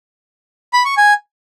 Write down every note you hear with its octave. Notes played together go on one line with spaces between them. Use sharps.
B5
C#6
G#5